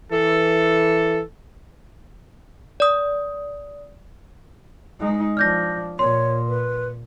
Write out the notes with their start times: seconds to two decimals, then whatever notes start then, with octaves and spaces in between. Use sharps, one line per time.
0.12 E3 A4
2.80 D5 D#6
5.00 G#3 D#4
5.37 F3 D4 F6 G6 A#6
5.99 A#2 C#5 C6
6.48 B4